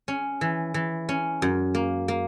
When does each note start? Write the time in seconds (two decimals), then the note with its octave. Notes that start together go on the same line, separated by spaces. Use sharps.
0.08 C#4
0.41 E3
0.74 E3
1.09 C#4
1.42 F#2
1.75 A#3
2.08 A#3